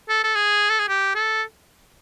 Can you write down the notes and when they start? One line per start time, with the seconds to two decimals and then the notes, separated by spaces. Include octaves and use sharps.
0.09 A4
0.24 A4
0.35 G#4
0.70 A4
0.79 G#4
0.88 G4
1.15 A4